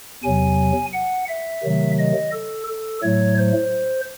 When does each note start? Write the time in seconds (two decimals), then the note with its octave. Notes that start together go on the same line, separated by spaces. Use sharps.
0.23 E2 C3 F#3 G#5
0.93 F#5
1.28 E5
1.63 C3 D#3 F#3 A3
1.99 D#5
2.32 A4
2.67 A4
3.03 A2 F#3 A3 C#5
3.38 C5